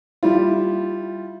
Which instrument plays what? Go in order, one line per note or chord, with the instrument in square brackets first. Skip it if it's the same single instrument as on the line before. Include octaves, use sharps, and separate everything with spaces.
[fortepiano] G3 E4 F4